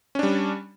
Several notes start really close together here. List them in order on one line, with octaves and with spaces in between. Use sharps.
C#4 D4 G3